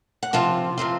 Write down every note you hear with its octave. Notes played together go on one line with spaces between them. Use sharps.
F#5
C3 F3 C4 F4 A5
C3 F3 C4 F4